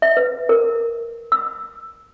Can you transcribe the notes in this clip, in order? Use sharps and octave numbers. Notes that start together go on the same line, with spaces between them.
E5
B4
A#4
E6